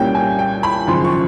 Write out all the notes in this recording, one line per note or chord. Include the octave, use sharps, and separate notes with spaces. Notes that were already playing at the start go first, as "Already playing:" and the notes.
Already playing: C2 A#2 G3 A#3 C#4 G5
G#5
G5
B5
G#1 F#2 C#3 F3 C6
C#6